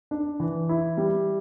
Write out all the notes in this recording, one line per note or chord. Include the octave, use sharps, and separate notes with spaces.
D4
E3
E4
G3